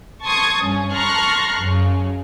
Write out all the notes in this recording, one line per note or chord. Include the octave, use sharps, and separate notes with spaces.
A5 C6 C#6 D#6 G#6
G2 C#4
A5 A#5 C6 C#6 F6 F#6
F#2 C#3